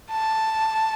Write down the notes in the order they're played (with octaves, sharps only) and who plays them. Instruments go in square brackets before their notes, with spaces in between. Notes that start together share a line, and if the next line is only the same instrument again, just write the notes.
[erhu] A5